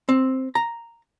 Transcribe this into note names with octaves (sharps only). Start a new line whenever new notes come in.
C4
A#5